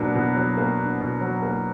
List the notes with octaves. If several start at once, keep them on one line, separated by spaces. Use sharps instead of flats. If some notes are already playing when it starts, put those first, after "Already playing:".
Already playing: B2 F#3 A#3 D4
B2
F#3
A#3
D4
B2
F#3
A#3